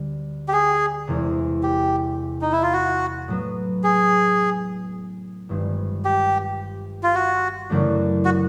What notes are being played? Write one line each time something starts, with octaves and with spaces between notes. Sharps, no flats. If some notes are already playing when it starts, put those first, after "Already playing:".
Already playing: D2 D3 G3
G4
G#4
E1 E2 C3
G4
D#4
E4
F4
F#4
A2 F#3 B3
G#4
G1 G2 D#3 G#3 C4
G4
F4
F#4
F#2 C#3 E3 A3 D4
F#4